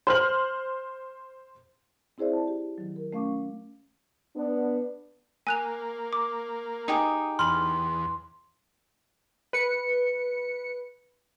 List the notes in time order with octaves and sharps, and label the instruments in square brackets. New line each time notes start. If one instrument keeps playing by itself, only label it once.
[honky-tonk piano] C5 F6 F#7
[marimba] C4 E4 G#4 C5 D5 E5
A5
G4
D#3 F#3
A#4
A3 C#4 F5 C#6 D6
[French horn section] B3 D4
[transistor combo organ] A#3 [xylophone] G#5 F#6 F7
[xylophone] D6
[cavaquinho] D#4 G4 G#4
[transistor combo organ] E2 [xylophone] B5 F6 [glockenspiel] C6
[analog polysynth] B4 C#7